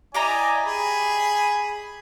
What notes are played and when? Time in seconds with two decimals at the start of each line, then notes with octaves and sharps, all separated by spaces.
0.14 E4 G4 D5 D#5 G#5 A#5
0.65 G#4 B5